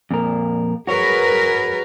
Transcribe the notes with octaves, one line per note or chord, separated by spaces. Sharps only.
F2 A#2 A#4
F#4 G#4 A#4 B4 C#5